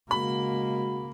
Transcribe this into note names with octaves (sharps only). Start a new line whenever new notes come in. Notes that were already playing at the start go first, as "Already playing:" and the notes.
C#3 G#3 A#3 F#4 B5